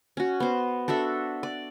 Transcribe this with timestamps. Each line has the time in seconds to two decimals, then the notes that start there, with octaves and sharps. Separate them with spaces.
0.17 C#4 F#4
0.40 B3 C5
0.88 D4 F#4 A4 E5
1.43 D5